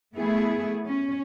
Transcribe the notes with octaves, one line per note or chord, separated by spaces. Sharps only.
A3 B3 E4 G#4
C#4